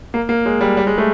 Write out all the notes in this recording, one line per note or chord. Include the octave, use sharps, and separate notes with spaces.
A#3
A#3
G#3
G3
G3
G#3
A3